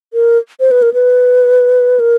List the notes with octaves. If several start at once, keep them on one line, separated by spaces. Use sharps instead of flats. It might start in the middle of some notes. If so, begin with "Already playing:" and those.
A#4
C5
B4
A#4
B4
A#4